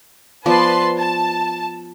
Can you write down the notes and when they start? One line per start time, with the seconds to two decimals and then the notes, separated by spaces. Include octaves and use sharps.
0.46 F3 B3 B4 D5 A5 C6
0.97 A5